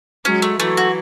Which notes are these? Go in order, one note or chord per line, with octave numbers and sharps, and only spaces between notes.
F#3 G#3 C#4
A3
E3 F#3 A3
F#4